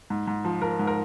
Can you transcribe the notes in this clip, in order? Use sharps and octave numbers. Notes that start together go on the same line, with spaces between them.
G#2
G#2
F3
F3 A#4
G#2
A#4